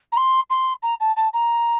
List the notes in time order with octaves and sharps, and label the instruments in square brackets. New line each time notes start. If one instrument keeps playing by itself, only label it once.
[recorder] A#5
C6
C6
A#5
A5
A5
A#5